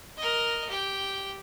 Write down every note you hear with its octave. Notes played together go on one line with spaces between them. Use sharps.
A#4 D#5
G4 G5